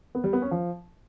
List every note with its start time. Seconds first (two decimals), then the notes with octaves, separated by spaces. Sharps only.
0.15 B3
0.24 G3
0.33 B3
0.42 C#4
0.51 F3